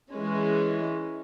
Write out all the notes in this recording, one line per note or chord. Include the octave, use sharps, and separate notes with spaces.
E3 G#3 C#4